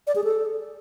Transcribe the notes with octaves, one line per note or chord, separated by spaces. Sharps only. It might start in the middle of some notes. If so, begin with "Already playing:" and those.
D5
G#4
A4